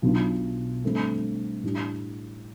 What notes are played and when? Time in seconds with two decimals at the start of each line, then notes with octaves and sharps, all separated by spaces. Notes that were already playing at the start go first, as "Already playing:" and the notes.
0.02 B1 B2 B3 D4 F4
0.84 G2 D3 A3 C4
1.63 A2 G3 D4